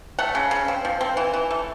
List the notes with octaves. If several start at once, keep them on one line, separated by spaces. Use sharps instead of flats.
A3 F#5
C#3
C#3
C4
F3
C4
E3
E3
A3